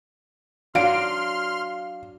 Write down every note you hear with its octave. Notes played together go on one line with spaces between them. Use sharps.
F#3 D4 F5 C6 F6 D7